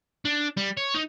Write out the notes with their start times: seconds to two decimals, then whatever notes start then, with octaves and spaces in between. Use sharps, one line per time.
0.25 D4
0.57 G3
0.77 C#5
0.94 D#4